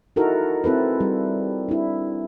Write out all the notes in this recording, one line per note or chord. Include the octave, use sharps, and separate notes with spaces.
D#4 E4 F#4 A4 A#4
C4 E4 A4 B4
G3
D4 E4